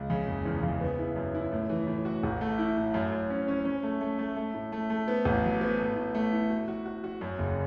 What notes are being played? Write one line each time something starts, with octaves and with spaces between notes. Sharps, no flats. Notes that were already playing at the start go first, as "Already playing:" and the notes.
Already playing: C#2
C#3
F#1
E2
C#3
B3
E4
F#2
E4
A2
E3
A2
F#4
A1
A3
E4
A2
F#2
F#2
C#4
C#4
C#4
A3
A3
A3
A3
A2
A3
A3
B3
A1
F#3
B3
A3
A2
A3
E4
F#4
F#4
F#4
F#4
F#2
F#1